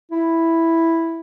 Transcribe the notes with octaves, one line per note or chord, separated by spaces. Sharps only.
E4